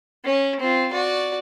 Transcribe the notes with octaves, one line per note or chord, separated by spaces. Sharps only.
C#4
C4 F4
F#4 D5